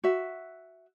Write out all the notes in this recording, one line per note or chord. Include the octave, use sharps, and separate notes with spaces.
F#4 E5